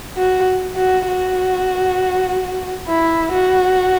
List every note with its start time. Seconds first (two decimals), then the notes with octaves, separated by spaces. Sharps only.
0.17 F#4
0.76 F#4
1.07 F#4
2.88 E4
3.33 F#4